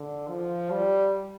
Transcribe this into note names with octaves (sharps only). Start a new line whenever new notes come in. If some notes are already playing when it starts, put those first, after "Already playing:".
Already playing: D3
F3
G3